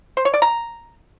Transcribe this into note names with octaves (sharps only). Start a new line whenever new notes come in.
C5
C#5
D5
A#5